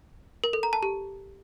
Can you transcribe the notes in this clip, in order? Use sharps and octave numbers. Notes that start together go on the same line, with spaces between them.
A#4
A4
A#5
A5
G4